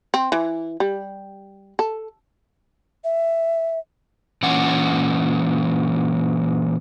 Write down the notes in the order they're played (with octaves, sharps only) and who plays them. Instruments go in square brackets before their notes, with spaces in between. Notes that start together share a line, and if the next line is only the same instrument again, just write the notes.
[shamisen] C4
E3
G3
A4
[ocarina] E5
[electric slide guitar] A#2 E3 C#4 F#5